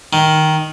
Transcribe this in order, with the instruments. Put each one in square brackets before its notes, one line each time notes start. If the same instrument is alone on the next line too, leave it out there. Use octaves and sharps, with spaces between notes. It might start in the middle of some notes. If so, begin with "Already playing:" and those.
[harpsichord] D#3